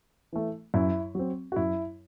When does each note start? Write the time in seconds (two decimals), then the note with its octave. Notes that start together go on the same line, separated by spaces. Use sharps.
0.33 E3 A3
0.74 F#2 E4
1.15 F#3 C4
1.52 F#4
1.56 F#2 E4